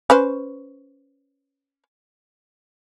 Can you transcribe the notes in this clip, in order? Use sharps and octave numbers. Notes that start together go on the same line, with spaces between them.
C#4 B4 C5